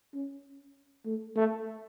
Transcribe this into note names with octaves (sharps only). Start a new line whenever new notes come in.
C#4
A3
A3